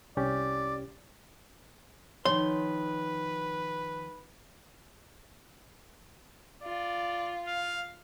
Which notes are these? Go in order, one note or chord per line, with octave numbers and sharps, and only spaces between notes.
C2 C#4 G4 D5
D#3 F3 B4 C#5 C6
F4 D5
F5